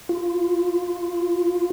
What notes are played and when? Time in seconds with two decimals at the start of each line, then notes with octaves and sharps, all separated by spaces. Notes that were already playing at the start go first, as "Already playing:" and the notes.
0.09 F4